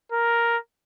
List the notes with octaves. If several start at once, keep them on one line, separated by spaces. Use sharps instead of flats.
A#4